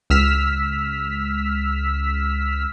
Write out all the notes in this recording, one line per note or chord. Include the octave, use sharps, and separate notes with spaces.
C#2 E6 F6 B6